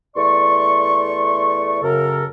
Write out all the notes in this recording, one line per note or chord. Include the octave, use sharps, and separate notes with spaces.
E2 A3 D5 C6 C#6
F#2 C#3 A4 A#4